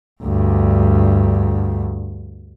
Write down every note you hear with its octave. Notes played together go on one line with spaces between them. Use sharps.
D2 G2